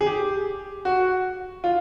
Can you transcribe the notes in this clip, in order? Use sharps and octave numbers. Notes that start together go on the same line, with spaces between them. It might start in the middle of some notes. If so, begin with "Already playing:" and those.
G#4
G4
F#4
F4